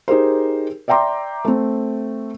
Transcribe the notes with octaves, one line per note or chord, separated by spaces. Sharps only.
D#4 G4 G#4 A#4 C5
D5 E5 G5 A#5 C6 D6
A3 C4